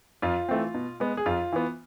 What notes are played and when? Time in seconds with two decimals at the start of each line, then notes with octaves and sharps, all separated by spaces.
0.22 F2 F4
0.49 E3 A3 C4
0.74 B2
1.00 G#3 B3
1.17 G#4
1.26 F2 F4
1.52 E3 B3